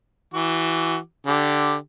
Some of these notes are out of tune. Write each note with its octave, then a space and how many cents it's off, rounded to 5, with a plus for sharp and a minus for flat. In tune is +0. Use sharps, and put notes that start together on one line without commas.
E3 +0 F#4 +25 D6 +0
D3 +0 G4 +0